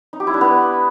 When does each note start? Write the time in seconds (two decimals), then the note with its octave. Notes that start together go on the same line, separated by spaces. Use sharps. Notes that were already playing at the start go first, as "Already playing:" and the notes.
0.13 D#4
0.20 G4
0.27 E4
0.34 D4
0.41 B3